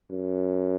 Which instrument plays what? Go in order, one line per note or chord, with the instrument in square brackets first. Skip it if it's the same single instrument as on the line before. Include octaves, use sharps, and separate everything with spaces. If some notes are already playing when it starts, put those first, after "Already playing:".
[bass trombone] F#2